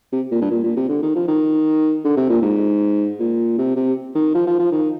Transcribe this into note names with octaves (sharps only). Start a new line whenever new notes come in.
C3
A#2
G2
A#2
A#2
C3
D3
D#3
F3
D#3
D3
C3
A#2
G#2
A#2
C3
C3
D#3
F3
F3
F3
D#3